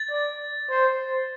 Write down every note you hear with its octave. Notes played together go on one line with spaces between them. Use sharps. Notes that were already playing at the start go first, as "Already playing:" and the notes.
Already playing: A6
D5
C5